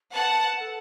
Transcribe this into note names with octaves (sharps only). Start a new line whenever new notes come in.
B4 F#5 A5
A4